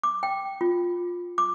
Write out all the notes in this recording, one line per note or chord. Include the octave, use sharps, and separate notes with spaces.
D6
G5
F4
D6